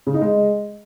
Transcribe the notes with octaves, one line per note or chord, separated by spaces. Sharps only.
C#3
D#4
G#3